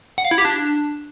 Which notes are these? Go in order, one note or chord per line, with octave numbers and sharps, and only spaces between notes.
F#5
F5
E4
G4
D4